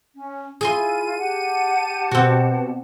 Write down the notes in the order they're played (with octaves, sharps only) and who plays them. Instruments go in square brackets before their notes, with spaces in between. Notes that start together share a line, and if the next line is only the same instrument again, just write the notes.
[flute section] C#4
[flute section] E4 F4 [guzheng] G#4 G#5 C6 [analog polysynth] D#7
[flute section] G4 F#5 A5
[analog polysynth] B2 [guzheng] C4 F#4